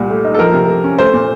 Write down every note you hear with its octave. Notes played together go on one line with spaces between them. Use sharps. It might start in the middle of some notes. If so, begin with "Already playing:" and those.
Already playing: C2 A#2
A3
D#4
A4
F3 A#4
C3
A#3
C#4
A3 C5
A#2